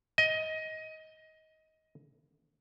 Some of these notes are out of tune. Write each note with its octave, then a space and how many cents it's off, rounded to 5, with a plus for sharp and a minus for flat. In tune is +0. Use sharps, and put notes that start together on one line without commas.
D#5 +20